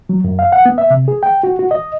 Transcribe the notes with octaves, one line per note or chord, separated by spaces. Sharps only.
F#3
F#2
F5
F#5
B3
E5
C3
G#4
G5
F#4
F#4
D#5